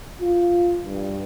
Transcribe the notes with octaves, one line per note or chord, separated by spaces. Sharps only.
F4
G2